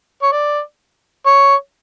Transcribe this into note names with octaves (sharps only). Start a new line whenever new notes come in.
C#5
D5
C#5